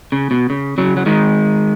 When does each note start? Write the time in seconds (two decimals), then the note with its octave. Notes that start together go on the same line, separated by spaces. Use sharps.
0.12 C#3
0.31 B2
0.50 C#3
0.78 C#3 F#3
0.97 F#3
1.06 D#3 G#3